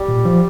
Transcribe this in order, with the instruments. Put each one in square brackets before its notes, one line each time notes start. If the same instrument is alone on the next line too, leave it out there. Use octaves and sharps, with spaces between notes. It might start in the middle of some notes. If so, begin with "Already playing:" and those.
Already playing: [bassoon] G3
[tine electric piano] A#2
F3